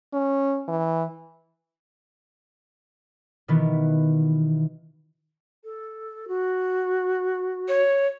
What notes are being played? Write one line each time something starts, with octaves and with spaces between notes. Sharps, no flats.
C#4
E3
B2 D#3 E3 B3
A4
F#4
C#5